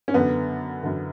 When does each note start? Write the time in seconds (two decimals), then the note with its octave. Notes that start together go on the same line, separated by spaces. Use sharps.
0.08 C#4
0.14 F#2 D3 B3
0.83 F#2 D3